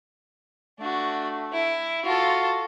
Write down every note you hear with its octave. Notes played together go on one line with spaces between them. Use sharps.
A3 D4 F#4
E4
F4 F#4 A4